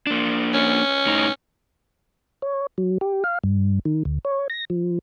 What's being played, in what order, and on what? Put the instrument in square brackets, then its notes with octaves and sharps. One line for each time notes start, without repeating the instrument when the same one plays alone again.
[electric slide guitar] A#3 D4
[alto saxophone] C#4
[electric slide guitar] A2 D#4
[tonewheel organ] C#5
F#3
G4
F5
G2
D#3
D2
C#5
A#6
F3